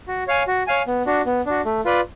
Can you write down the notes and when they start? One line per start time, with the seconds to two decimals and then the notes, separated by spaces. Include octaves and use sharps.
0.08 F#4
0.28 C#5 F5 G#5
0.47 F#4
0.67 C#5 F5 G#5
0.87 B3
1.06 D4 F#4
1.26 B3
1.46 D4 F#4
1.65 A3
1.85 F4 B4 D5